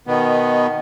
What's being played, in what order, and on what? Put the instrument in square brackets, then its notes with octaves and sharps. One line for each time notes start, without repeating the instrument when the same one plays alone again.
[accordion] B2 D#3 B3